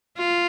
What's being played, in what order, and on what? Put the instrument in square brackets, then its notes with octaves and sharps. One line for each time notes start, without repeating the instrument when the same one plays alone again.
[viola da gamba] F4